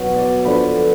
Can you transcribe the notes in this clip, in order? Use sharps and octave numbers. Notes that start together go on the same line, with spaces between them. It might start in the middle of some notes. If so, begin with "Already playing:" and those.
Already playing: B2 F#3 B4
D5
D3 F3 B4